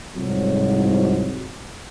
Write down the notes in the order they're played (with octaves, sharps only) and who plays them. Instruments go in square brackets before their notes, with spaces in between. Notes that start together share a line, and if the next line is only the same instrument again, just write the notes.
[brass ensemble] C2 F2 G#2 F#3